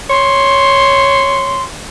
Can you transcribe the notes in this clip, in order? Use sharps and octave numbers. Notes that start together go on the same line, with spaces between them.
C#5 C6